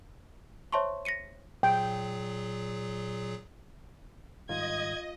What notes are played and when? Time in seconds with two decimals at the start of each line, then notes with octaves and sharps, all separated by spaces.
0.72 C5 C#5 E5 A5 C6 C#6
1.05 A#6 B6 C#7 D#7
1.63 A#2 F#3 G#4 G5
4.49 G#2 D#3 G3 F4 D#5 G#6